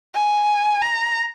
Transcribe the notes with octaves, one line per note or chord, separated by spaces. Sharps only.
G#5
A#5